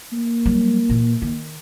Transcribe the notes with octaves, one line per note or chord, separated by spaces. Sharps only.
A#3
F#3 G3
A#2 E3
D#3